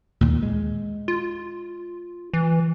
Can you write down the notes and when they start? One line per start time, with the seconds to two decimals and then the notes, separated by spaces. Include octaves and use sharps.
0.21 D#2 A#2
0.42 G#3
1.08 F4
2.34 E3